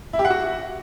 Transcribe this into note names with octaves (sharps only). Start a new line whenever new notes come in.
E4
G4
F#5
F#4